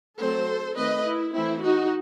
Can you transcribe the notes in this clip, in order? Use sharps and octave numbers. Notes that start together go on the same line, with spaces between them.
F#3 A3 C4 A4 C5
D#3 A3 C4 B4 D#5
E4
E3 A3 C4 E4
D#4 F#4